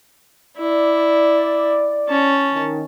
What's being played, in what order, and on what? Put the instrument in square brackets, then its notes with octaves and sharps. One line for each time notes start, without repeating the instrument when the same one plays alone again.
[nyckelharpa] E4 [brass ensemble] D5
[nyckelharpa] C#4 A5
[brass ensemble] D#3